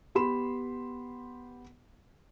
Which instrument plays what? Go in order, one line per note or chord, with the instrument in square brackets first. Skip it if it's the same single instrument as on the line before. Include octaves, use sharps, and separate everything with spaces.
[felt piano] B3 G4 B5 C6 E7